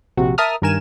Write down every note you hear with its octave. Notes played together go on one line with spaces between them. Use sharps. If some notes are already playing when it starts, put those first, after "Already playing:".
A#1 C3 F#4
A#4 E5 A5 D#6 F6
G2 D#3 A#4 G#5 E7